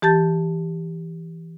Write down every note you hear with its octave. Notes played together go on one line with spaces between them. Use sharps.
E3 G4 A5 G6 A6